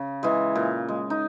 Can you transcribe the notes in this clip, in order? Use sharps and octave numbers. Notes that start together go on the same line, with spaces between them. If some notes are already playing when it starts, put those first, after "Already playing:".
Already playing: C#3
E3 G#3
A#2
G#3
D#4